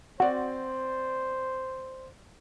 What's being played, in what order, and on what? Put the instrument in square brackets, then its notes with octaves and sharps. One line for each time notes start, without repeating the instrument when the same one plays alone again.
[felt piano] C4 D5 [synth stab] F#4 [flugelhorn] C5